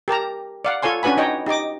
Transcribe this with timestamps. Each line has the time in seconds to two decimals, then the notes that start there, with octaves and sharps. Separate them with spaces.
0.08 G4 A#4 A5 A#5
0.65 D5 F5 F#5
0.82 F4 A4 C#5 G#5 C6
1.03 C#4 D4 F#4 B4 G#5 B5
1.17 D#4 C#5 D#5 G5
1.46 D#4 G4 D#5 D6